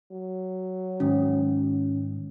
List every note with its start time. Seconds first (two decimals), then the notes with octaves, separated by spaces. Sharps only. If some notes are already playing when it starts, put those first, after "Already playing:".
0.11 F#3
1.00 G#2 D#3 C#4